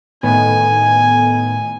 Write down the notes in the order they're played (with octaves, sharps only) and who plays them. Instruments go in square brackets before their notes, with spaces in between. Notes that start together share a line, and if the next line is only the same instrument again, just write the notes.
[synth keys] A2 D#3 B3 [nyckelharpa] G#5